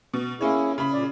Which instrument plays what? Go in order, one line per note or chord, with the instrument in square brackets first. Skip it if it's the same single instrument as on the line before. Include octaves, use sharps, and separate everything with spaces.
[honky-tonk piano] B2
[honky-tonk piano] A#3 C#4 C#5 [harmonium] E4 G#4
[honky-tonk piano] C#3 B5
[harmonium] A#2 D5